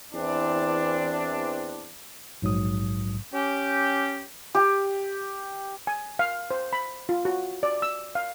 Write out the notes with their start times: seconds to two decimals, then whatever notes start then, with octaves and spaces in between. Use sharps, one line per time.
0.13 E2 E3 C4 D4
2.42 A#1 G#2 F#3 D#6
3.33 C#4 G4
4.55 G4
5.87 G#5
6.19 F5
6.51 C5
6.73 B5
7.09 F4
7.25 F#4
7.63 D5
7.82 E6
8.15 F5